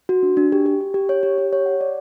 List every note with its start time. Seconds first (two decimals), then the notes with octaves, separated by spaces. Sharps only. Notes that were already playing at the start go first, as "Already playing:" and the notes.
0.09 F#4
0.23 D4
0.37 D4
0.52 G4
0.66 G4
0.81 G4
0.94 G4
1.09 C#5
1.23 G4
1.38 G4
1.53 C#5
1.66 F#5
1.81 D5